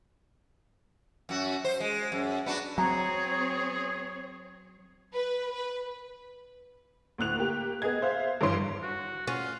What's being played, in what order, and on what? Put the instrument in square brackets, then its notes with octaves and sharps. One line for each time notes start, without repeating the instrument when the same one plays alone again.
[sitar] F#2 F#4
C5
G#3
F#2
B3 D4 F#4
[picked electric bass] F#3 [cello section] C4 C#5 [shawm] G#4 [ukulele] A#5
[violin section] B4
B4
[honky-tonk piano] D2 A2 F#6 F7
A#3 G4
B3 G#4 D#5 G#6
C5 E5 F5
G2 E3 C#5 C6 D7
[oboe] F#4
[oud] C#4 [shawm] F4 [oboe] F#5